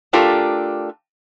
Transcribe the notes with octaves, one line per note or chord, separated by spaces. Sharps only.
A3 D4 F4 G4 A4 A#4